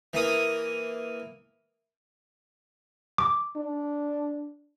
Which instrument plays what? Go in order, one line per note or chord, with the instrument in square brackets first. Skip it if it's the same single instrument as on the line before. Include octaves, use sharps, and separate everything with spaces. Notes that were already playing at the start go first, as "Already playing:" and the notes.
[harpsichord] E3 A#3 D#6
[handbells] D6
[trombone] D4